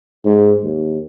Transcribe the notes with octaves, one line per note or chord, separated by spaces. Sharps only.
G#2
D#2